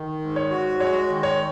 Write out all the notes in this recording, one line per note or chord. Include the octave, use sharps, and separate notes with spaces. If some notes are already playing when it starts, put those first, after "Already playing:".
Already playing: D#3
G#2
C#5
F#4
G#3 C#5
D#3
C#5